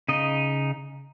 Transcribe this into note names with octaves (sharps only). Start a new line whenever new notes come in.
C#3 D#4 D#5